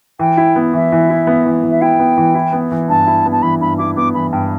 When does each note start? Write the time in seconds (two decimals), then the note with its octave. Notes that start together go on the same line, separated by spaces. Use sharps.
0.19 E3 G5
0.37 E4
0.56 B3
0.74 E3 E5
0.92 E3
1.10 E4
1.27 B3
1.46 E3
1.64 E3
1.71 E5
1.81 E4 G5
1.99 B3
2.18 E3
2.35 E4
2.53 B3
2.72 E3
2.89 G2 A5
3.07 E4
3.25 B3
3.32 A5
3.42 E3 B5
3.61 G2 B5
3.78 E4 D6
3.96 B3 D6
4.14 E3 B5
4.32 G2 G5